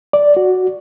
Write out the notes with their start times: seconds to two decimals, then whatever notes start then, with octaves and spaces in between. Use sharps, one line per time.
0.13 D5
0.37 F#4